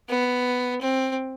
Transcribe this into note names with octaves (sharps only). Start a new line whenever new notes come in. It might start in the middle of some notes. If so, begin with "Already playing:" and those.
B3
C4